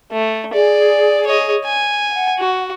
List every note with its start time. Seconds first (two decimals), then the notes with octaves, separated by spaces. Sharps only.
0.12 A3
0.54 G#4 D5
1.27 C#5 D#5
1.65 G#5
2.10 F#5
2.39 F#4